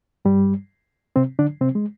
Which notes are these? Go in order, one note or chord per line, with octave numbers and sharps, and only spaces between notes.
G2 G3
C3 C4
D3 D4
C3 C4
G#3